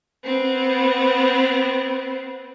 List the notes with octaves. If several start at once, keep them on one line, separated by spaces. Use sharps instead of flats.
B3 C4